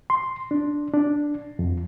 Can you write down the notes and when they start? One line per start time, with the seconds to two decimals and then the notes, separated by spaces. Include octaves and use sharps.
0.10 C6
0.51 D4
0.94 D4
1.59 F2